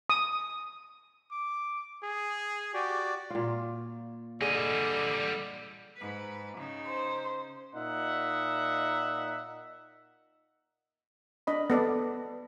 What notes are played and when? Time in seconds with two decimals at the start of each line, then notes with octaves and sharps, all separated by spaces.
0.10 D#6
1.32 D6
2.03 G#4
2.74 F#4 G4 D5
3.30 A#2 F4
4.41 D3 G3 G#4 D#5
5.97 G#2 B4
6.57 C#3 D#4
6.87 C5
7.75 A#2 D#4 E5 F#5
11.47 D4 D#5 B5
11.70 B3 A4 D5